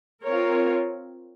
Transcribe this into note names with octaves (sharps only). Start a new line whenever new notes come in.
C4 F4 A#4 C#5